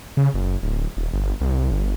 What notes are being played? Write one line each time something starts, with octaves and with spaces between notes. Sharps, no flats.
C#3
F#1
D1
D#1
G1
C2
G1